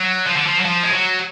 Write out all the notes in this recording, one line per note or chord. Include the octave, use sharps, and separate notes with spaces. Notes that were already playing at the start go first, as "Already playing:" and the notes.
Already playing: F#3
F3
D3
F3
F#3
F3
G#3
F#3